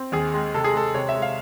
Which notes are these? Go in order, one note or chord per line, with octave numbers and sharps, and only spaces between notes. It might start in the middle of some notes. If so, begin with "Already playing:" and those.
Already playing: C4
D#2 G#4
G#3
C3 A4
G#4
G#3 A4
C3 C#5
E5
G#3
F5